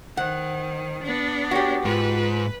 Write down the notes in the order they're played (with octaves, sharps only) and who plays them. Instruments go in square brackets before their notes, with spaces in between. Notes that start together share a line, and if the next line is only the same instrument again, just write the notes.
[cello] D#3 [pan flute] C5 [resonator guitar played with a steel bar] F#5
[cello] B3 D4
[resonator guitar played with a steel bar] F#4 G4 [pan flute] C#5
[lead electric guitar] G#2 [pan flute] F4 [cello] B4